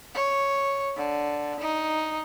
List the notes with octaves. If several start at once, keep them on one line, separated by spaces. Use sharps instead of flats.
C#5
D3
D#4